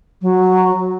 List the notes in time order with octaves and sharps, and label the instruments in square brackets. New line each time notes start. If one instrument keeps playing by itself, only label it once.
[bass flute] F#3